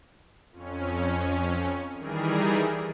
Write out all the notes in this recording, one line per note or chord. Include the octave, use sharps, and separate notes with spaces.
F2 C#4
D#3 E3 G3 G#4 A#4